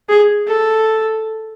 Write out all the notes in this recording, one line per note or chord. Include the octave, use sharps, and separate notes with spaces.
G#4
A4